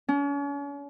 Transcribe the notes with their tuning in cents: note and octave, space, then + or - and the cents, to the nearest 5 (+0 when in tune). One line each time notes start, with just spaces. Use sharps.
C#4 +40